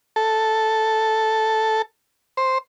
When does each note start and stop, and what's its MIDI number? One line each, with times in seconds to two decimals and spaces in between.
0.16 1.82 69
2.37 2.58 72